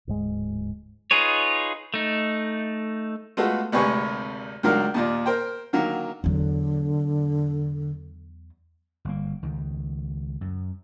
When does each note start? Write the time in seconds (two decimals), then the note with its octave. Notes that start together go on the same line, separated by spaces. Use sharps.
0.07 D1 G#2 G#3
1.11 D#4 F4 G#4 B4 C#5
1.94 A3 D#4
3.37 G#3 A3 B3 F4 F#4 A4
3.72 G#1 D2 C3 B4 G#5 C#6
4.63 C#2 D#3 F#3 D4 A#4 F5
4.94 D#2 A#2 D5
5.26 A#4 C5 G5
5.73 D3 D#3 F#3 A#3
6.24 E2 D3 F#3
9.05 G1 A#3
9.42 C#2 D#3
10.41 F#2